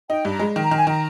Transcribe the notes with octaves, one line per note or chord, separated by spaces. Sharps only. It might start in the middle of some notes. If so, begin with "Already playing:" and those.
D#4 G5
G2 A#5
G#3
D#3
A#5
D#3
G#5
D#3 A#5